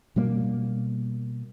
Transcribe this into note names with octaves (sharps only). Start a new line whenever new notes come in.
B2 G3 A#3